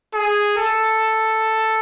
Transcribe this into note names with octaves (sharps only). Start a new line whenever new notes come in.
G#4
A4